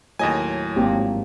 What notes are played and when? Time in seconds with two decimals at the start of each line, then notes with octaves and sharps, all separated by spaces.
0.19 D#2 A2 F#3 D#5 G#5
0.76 G#1 A#3 C4 G4